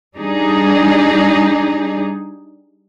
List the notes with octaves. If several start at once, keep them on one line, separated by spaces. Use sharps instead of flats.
G3 D4 D#4 G#4